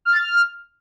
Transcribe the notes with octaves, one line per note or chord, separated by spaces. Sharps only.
F6
A6
F6